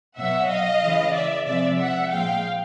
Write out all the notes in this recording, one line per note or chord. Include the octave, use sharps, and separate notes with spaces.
B2 F#3 E5 F#5
D#5 F5
C#3 E3 G#3
D5 E5
C3 F3 G#3 D5 E5
E5 F#5
A#2 F3 G#3 F5 G5